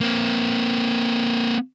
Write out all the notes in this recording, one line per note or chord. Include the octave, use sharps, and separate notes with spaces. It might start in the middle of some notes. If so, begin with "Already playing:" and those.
A#3 C4